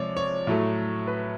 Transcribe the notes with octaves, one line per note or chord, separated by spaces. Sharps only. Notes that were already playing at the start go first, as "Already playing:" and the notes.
Already playing: C3 F3 G#3 C#5 D5
C#5
A2 F#3 A3
B4